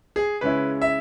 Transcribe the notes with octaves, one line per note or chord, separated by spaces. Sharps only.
G#4
C#3 G#3 C#4 E4 B4
E5